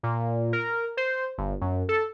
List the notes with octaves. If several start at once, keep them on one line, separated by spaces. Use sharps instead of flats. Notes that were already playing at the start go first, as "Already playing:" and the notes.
A#2
A#4
C5
G1
F#2
A4